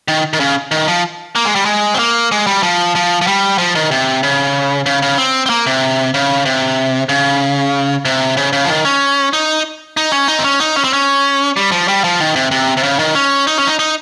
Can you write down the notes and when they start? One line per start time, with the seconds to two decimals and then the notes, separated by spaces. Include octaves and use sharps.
0.08 D#3
0.33 D#3
0.40 C#3
0.71 D#3
0.88 F3
1.35 A#3
1.45 G#3
1.55 G3
1.65 G#3
1.94 C4
1.99 A#3
2.32 G#3
2.47 G3
2.63 F3
2.95 F3
3.21 F3
3.27 G3
3.58 F3
3.75 D#3
3.91 C3
4.23 C#3
4.86 C#3
5.02 C#3
5.18 C4
5.46 C4
5.50 A#3
5.66 C3
6.14 C#3
6.45 C3
7.09 C#3
8.05 C3
8.37 C#3
8.53 C#3
8.64 F3
8.69 D#3
8.85 C#4
9.33 D#4
9.97 D#4
10.12 C#4
10.28 D#4
10.39 C4
10.44 C#4
10.60 D#4
10.76 C#4
10.84 C4
10.93 C#4
11.56 G3
11.72 F3
11.88 G3
12.04 F3
12.20 D#3
12.36 C3
12.51 C3
12.77 C3
12.83 C#3
12.99 D#3
13.15 C#4
13.47 D#4
13.58 C#4
13.67 D#4
13.79 D#4